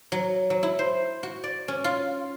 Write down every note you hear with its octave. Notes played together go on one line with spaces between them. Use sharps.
F#3
F#3
E4
C5
F#4
D5
C#4
F4